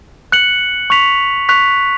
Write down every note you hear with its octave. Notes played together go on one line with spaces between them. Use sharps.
F#6 C#7 F#7
C#6 F#6 B6 F7
C#6 F#6 B6 F7